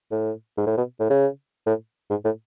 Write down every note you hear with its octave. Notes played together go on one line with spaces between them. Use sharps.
A2
G#2
A2
B2
A2
C#3
A2
G#2
A2